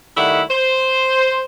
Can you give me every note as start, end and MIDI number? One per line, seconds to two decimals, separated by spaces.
0.17 0.42 51
0.17 0.42 55
0.17 0.42 57
0.17 0.42 64
0.17 0.42 76
0.17 0.42 78
0.50 1.44 72